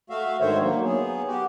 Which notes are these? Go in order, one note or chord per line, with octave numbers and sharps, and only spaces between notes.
A3 F#4 E5 F5
G#2 D3 D#3 C5 C#5 E5
F#3 A#3
B3 G#4
F#4 G4